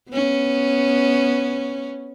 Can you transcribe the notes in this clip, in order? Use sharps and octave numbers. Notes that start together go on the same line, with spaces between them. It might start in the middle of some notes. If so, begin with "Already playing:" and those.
B3 C#4